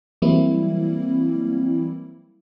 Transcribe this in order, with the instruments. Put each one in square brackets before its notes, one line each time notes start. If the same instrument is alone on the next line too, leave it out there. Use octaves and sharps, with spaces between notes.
[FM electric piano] E3 F#3 G3 A#3 C4 E4